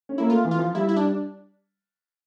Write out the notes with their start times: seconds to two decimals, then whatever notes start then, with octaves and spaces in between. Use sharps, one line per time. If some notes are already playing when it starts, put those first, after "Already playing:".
0.09 C#4
0.18 A#3 E4
0.29 A3 F4
0.45 E3
0.51 F4
0.59 F3
0.75 G3 E4
0.89 E4
0.96 D4